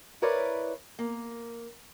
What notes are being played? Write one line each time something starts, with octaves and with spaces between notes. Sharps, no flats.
E4 A#4 B4 C#5 D5 F5
A#3